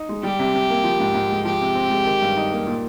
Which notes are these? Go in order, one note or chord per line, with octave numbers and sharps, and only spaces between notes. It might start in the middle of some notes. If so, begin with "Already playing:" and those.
Already playing: D#4
G#3
G3 G4
C3
C3
A#3
F3
G#2
G#2
G#3
F3 G4
C3
C4
G#3
D#3
G2
D#4
A#3
A#2